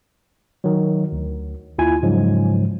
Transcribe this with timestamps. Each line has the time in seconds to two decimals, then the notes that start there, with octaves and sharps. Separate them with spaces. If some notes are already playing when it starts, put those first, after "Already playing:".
0.64 D#3 F#3
1.12 D2
1.78 D#2 E4 F4 G#5
2.03 G#2 C#3 F3 F#3 G#3